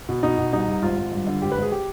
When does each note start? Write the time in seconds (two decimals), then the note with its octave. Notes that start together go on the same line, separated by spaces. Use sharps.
0.09 B2
0.23 B2 D#4
0.38 B2
0.53 C2 D#4
0.68 C2
0.82 G#1 F4
0.97 G#1
1.12 G2
1.27 D3
1.42 G#1 G4
1.52 B4
1.57 G#1
1.62 G#4
1.72 G4